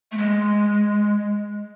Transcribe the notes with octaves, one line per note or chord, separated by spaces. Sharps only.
A3
G#3